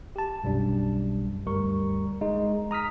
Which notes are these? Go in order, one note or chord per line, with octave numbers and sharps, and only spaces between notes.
G4 A5
B1 F#2 G3 D4
D2 G2 G3 A#4 C#6
G#3 D#4
A#5 D#6 F6 B6